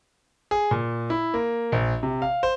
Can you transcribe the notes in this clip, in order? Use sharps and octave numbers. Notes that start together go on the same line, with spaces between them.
G#4
A#2
E4
A#3
A#1
C3
F5
C5